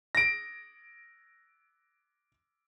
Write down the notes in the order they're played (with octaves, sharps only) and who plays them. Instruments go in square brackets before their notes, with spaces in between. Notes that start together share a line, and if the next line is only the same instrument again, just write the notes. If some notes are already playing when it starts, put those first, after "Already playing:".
[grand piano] A#6 D7